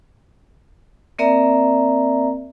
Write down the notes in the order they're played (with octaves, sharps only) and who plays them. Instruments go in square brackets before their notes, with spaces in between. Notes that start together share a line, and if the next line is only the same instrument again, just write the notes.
[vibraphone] A#3 C4 A#4 D5 E5 A#5